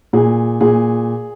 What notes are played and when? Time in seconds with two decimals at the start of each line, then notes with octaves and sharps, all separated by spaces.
0.13 A#2 G#4
0.61 A#2 G#4